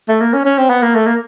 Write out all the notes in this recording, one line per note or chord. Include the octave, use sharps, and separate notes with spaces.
A3
A#3
C#4
C#4
C4
B3
A#3
A3
A#3